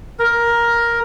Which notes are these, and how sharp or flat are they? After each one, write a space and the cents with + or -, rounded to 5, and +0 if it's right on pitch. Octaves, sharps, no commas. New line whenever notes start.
A#4 +10